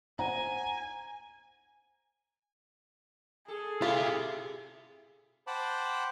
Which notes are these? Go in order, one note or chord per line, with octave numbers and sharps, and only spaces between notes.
C5 F#5 G#5 A#5
G#4 A4
G3 E4 F4 G4 E5
C5 F#5 G5 A5 B5 D6